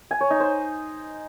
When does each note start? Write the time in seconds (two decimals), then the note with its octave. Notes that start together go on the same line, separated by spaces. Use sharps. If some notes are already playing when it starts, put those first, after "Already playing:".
0.11 G#5
0.21 C#5
0.30 D#4
0.40 C5